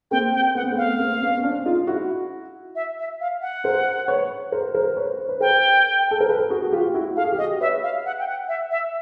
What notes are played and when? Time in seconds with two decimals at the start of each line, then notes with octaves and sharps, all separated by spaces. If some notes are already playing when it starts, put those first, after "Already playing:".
0.11 A#3 C4 G5
0.34 G5
0.55 B3 F#5
0.64 C4
0.72 A3 B3
0.77 F5
0.99 A#3 C4
1.21 B3 C#4
1.38 C#4
1.43 C4 D4
1.65 D#4 F4
1.87 E4 F#4
2.75 E5
2.99 E5
3.21 F5
3.42 F#5
3.64 A#4 C5
4.08 B4 C#5
4.52 A#4 C5
4.74 A#4 C5
4.97 B4 C#5
5.19 C5
5.29 B4
5.41 A#4 C5 G5
6.11 A4
6.20 A#4
6.29 A4 B4
6.50 F#4 G#4
6.62 F#4
6.73 F4 G4
6.94 E4 F#4
7.16 A4 F5
7.24 G#4
7.32 G4
7.38 F#4 G#4 D#5
7.61 B4 C#5 E5
7.83 F5
8.05 F#5
8.19 G5
8.27 F#5
8.48 E5
8.71 E5